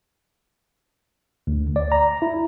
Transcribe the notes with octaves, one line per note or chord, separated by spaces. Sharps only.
D2
D5
A#5
E4